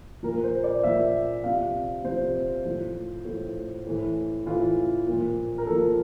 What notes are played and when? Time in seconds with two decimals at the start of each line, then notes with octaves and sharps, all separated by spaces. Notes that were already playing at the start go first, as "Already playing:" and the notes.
0.23 A#2 F3 A#4
0.44 C5
0.64 D5
0.83 A#2 F3 E5
1.44 C3 F3 F5
2.04 C3 F3 C5
2.65 A2 F3
3.25 A2 F3
3.86 A2 E3
4.46 A2 E3 F4
5.07 A#2 F3
5.58 A#4
5.66 A#2 F3 A4